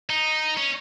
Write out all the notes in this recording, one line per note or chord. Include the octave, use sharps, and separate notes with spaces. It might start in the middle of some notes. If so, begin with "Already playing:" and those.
D#4
C#4